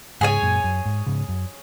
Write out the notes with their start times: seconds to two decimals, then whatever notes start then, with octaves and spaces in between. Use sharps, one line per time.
0.21 G#2 C#3 G#4 C#5 G#5
0.42 F#2 A#2
0.64 F#2
0.86 G#2
1.07 G#2 C#3
1.29 F#2